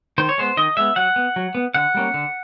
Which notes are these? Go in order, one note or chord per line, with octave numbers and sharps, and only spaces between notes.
D#3 C5
C#5
G#3 B3 C5
D#3 D#5
G#3 B3 E5
F#3 F#5
B3
F#3
B3
D3 F#5
G3 A#3 C#4
D3